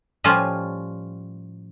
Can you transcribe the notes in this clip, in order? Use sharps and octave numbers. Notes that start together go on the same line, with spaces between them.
A2 F3 G3 C#4 F4